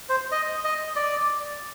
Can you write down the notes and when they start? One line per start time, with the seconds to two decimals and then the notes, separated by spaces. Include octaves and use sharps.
0.09 C5
0.32 D#5
0.64 D#5
0.96 D5